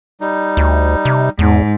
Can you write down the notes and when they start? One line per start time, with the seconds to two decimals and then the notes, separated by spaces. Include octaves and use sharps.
0.21 G3 D#4
0.57 D2
1.05 C3
1.39 E2 G#2